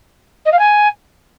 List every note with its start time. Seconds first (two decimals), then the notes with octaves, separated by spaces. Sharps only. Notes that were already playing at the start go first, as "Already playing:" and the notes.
0.45 D#5
0.52 F5
0.59 G#5